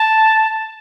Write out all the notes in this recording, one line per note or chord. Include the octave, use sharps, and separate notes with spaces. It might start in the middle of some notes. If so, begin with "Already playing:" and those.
Already playing: A5